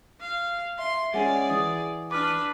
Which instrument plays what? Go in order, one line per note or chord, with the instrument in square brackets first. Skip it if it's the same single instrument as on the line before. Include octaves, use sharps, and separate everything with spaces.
[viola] F5
[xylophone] E5 [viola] C6
[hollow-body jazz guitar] G#3 C#4 [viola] G#4 D5 [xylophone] F#5 G#5
[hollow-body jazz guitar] E3 [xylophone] D#6
[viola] D4 B4 [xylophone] D6 F6